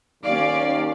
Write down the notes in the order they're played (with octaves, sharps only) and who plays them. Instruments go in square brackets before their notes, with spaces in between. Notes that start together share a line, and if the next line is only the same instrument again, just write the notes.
[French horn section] D#2 [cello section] C#4 D5 [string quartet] F5